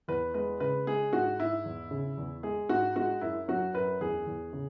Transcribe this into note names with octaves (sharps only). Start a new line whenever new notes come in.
E2 B4
G#3 B4
C#3 B4
G#3 G#4
G#2 F#4
G#2 E4
E2
C#3
E2
G#3 G#4
G#2 F#4
G#3 F#4
F#2 E4
F#3 F#4
F#2 B4
E2 G#4
E2
C#3